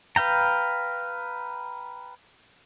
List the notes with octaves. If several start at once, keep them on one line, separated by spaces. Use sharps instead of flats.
B4 F5 G5 A#5